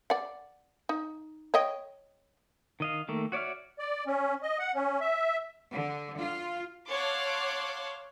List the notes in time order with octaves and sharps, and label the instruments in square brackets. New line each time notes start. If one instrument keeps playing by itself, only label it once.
[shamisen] D5 F#5
D#4
C#5 D#5 G5
[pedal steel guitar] D#3 D#5 F5
D#3 A3 A#3
F#4 C#5 D5 E5 F6
[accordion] D5
C#4
D#5
F#5
C#4
E5
[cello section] D3
F4
[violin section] C#5 F5 F#5 A5 C6 D6